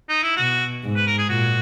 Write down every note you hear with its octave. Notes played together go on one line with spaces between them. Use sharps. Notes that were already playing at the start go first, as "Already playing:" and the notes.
D#4
E4
B2 F#4
G#2
B4
A#4
G#4
A#2 F#4